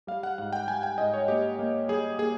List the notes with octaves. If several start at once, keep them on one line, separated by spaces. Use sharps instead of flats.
G3 F5
F#5
G#2 F#5
G5
G3 G#5
G5
G#2 D#5
C#5
A#3 G4
A#3
G3 G#4
A#3 G#4